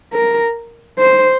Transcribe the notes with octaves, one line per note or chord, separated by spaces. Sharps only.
A#4
C5